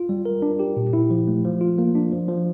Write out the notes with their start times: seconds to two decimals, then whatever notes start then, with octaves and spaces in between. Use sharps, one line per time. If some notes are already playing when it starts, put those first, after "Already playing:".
Already playing: F4
0.09 G3
0.25 A#4
0.42 D4
0.59 G4
0.77 A#2
0.93 E4
1.10 F3
1.28 A3
1.45 F3
1.61 F4
1.78 A#3
1.95 D4
2.12 F3
2.28 F3